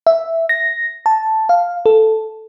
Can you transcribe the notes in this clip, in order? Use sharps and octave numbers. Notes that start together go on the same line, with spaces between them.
E5
A#6
A5
F5
A4